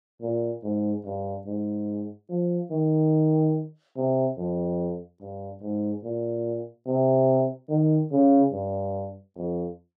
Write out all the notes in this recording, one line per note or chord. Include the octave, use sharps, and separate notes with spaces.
A#2
G#2
G2
G#2
F3
D#3
C3
F2
G2
G#2
A#2
C3
D#3
C#3
G2
F2